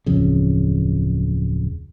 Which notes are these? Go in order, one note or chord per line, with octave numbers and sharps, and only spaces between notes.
D1 F2 C#3